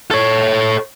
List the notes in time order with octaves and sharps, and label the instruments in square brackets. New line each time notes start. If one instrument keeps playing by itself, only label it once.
[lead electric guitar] A4 C#5